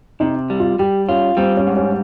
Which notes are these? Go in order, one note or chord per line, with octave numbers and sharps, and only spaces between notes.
C3 D#4
G3
F4
G3 G4
C#4 F4
G3 C4
C#4
G#2
C#4